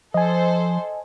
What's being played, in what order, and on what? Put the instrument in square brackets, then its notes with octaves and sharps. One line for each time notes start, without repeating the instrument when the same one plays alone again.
[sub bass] F3 [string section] A4 C5 [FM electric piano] D#5 G#5